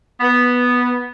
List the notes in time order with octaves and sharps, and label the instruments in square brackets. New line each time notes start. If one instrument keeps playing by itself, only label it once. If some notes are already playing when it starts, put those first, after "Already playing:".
[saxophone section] B3